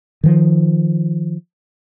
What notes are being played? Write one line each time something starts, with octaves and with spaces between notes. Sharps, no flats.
D#3 F3